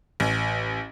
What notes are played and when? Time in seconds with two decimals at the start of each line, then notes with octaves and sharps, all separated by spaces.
0.20 A1